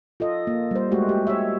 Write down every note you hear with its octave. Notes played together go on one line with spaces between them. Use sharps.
F4 A4 D#5
A#3
G3 C5
G#3 A3 F#4 G4
G4
C#5 E5